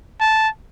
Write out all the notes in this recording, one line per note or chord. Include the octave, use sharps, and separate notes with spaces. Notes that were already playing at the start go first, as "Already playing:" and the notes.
A5